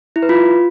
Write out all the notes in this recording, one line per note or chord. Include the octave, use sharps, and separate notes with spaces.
E4
B4
F4